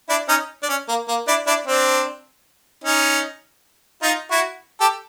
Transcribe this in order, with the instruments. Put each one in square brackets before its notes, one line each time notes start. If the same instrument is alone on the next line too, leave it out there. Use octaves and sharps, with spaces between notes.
[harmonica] D4 E4
C#4 D#4
D4
C#4
A#3
A#3
D4 E4
D4 E4
C4 D4
C#4 D#4
D#4 F4
E4 F#4
G4 A4